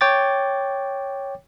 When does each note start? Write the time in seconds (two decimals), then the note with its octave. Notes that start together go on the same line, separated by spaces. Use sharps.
0.01 C#5 G5 D6 A6